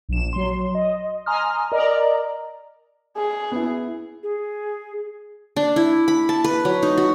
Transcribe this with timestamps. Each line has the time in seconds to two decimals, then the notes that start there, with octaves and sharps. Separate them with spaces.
0.09 A#1 E7
0.33 F#3 C6
0.75 D#5
1.26 G#5 A#5 C6 D#6 F6
1.72 A#4 D5 D#5 A#5
3.17 G#4
3.52 B3 E4
4.23 G#4
5.56 D4
5.76 E4
6.08 B5
6.29 A5
6.44 B4
6.65 F#3
6.83 D#4
6.98 F#4